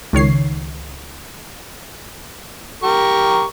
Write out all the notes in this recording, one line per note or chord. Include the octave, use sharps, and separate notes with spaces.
C#2 D#3 C#5 C7
G4 A#4 C#6